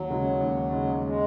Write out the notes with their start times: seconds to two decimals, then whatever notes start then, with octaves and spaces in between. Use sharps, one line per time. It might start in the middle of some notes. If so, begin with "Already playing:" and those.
Already playing: D#2 F#3
0.10 C#3 G#3
0.41 D#2
0.73 C#3 G#3
1.04 G#3